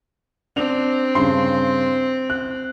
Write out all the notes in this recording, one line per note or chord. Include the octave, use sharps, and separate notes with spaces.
C4 D4 F7
G2 C#3 C6
F#6